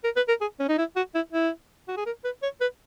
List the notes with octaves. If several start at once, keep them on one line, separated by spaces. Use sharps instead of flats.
A#4
B4
A#4
G#4
C#4
D#4
E4
F#4
E4
E4
F#4
G#4
A#4
B4
C#5
B4